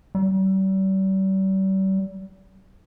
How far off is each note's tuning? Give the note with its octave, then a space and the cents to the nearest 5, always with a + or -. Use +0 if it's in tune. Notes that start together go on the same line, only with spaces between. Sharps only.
G3 -40